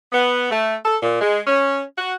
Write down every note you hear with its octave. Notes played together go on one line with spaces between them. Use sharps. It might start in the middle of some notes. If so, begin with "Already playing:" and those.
B3
A3
A4
A#2
G#3
C#4
F#4